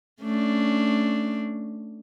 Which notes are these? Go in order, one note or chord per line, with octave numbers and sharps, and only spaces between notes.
A3 C#4 D4